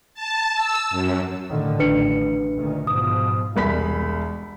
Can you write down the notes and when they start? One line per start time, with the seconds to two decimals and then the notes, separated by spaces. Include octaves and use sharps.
0.14 A5
0.55 E6
0.90 F#2
1.48 A2 D3 D#3
1.79 A1 D4 B4 C#7
2.57 D2 A#2 D#3
2.87 G#2 B2 F3 D#6
3.56 E1 C2 B5 B6